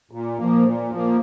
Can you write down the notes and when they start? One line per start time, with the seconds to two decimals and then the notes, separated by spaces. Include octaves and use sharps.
0.11 A#2
0.38 F3 A#3
0.64 A#2
0.90 F3 A#3